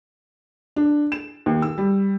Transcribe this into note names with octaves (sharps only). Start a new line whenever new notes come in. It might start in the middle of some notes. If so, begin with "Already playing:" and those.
D4
E7
D#2
E6
G3